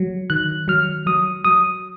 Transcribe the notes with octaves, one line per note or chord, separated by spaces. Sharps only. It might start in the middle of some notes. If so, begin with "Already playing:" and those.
Already playing: F#3
D#3 F#6
F#3 F6
F#3 D#6
F#3 D#6